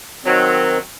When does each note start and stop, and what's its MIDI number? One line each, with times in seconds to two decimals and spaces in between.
0.25 0.78 51
0.25 0.78 54
0.25 0.78 60